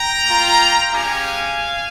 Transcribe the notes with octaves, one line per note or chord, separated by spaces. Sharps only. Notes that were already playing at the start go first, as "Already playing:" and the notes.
Already playing: G5 A#5
A#3 F4
G#3 C#4 G4 F5 G#5